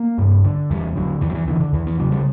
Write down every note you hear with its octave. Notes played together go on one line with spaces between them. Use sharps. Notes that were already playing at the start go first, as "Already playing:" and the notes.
Already playing: A#3
G2
D3
E2 G3
D3 F#3
E2 E3
F#3
E3
D3 E3
D3
E2 E3
E3
C#3 F#3
G3